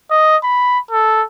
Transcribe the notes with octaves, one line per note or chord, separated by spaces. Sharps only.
D#5
B5
A4